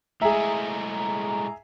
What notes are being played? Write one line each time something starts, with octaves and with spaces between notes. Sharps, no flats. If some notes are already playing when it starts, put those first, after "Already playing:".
A2 G#3 G#4 E5 A#5